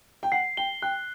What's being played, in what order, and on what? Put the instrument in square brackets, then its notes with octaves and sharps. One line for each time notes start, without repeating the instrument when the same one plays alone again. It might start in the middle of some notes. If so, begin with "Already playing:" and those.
[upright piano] G5
[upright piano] F#5 [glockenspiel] C7
[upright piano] G5 [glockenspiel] G7
[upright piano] G5 [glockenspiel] F#6